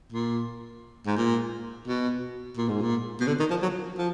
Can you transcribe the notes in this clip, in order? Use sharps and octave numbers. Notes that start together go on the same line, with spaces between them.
A#2
G#2
A#2
B2
A#2
G#2
A#2
B2
D3
D#3
F3
F#3
F3